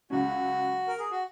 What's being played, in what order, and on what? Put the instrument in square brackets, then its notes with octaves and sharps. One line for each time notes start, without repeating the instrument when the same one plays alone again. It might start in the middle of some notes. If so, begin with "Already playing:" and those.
[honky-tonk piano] C#2 C#3 F#3 C#4 [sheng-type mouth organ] F#4
[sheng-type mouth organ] A#4
G#4
F#4